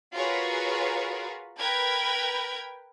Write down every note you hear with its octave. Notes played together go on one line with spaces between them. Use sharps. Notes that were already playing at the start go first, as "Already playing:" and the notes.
F4 F#4 G#4 A#4 B4 C#5
A#4 B4 G5 G#6